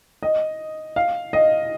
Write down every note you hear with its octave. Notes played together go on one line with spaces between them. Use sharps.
D#5
F5
D#5